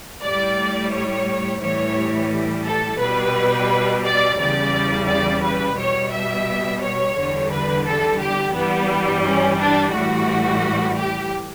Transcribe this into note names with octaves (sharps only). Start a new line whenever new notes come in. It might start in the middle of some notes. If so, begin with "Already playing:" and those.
A2 G3 D5
C#5
A2 E3 G3 C#5
A4
B2 G3 B4
D5
E2 C#3 G3 D5
D5
B4
B2 G3 C#5
E5
C#5
E2 D3 G3
B4
A4
G4
G2 E3 G3 B3
C#4
D4
A2 E3 G3 F#4
G4